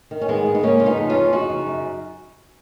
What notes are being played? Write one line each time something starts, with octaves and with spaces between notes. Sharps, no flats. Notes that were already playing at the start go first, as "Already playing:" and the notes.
D#3
C#4
G#2 G#3 B3
G#2
D#4
C#3 A#3 C#4
C#3 F4
B3 D#4
F2
C#4 F4
F2
C#3 D#4 F#4
C#3
F#2